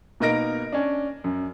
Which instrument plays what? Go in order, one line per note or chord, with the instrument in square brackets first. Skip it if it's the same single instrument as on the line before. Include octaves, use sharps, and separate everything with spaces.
[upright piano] B2 A#3 D#4 A#4 A#6 D7
C#4 D4
F#2